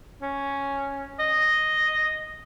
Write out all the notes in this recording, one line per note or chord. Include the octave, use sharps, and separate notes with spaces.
C#4
D#5